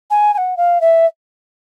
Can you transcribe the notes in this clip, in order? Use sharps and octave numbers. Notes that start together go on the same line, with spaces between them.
G#5
G#5
F#5
F5
E5